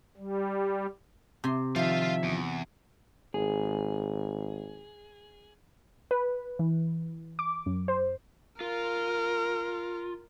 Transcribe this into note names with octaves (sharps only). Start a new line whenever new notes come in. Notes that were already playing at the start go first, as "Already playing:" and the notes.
G3
C3 C6
D#3 F3 F4 E5 F5
E2
G#1 G#4
B4
E3
D6
F#2
C5
F4 A#4